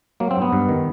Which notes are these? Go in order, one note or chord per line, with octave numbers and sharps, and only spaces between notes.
F#3 A#3
C4
G2
B3
G2
D#3